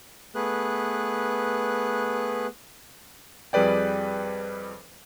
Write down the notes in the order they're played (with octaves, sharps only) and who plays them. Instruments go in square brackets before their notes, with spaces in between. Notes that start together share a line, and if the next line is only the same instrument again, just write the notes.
[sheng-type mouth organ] A3 B3 G#4 B4 F#6
[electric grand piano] F2 G3 G#4 B4 D5 G5